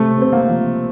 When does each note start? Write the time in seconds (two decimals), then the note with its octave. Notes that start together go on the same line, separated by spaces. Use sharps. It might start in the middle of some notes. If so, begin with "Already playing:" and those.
Already playing: C3 A3
0.17 C3 C4
0.32 A#3
0.48 F3